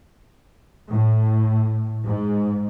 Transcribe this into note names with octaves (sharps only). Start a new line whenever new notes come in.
A2
G#2